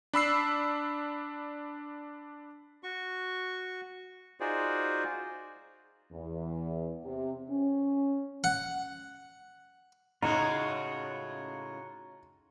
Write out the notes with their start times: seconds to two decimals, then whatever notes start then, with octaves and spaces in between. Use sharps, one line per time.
0.14 D4 B5 E6 C7
2.83 F#4 C#6
4.40 D#4 F4 F#4 G#4 C5 D5
6.12 E2
7.04 C3
7.50 C#4
8.44 F#5
10.22 A2 C#3 G#3 D#4 F4 F#4 C#5 A#5